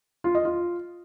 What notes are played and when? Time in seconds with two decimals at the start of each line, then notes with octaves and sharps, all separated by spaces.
0.24 F4
0.35 D#5
0.45 F4